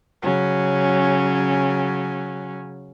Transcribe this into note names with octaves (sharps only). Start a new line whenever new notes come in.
C#3 F#3 C#4